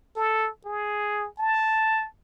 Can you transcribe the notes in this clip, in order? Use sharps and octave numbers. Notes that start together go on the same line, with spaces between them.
A4
G#4
A5